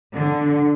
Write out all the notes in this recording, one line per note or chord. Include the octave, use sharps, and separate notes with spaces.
D3